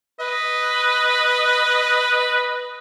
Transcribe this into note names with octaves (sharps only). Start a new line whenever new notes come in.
B4 D#5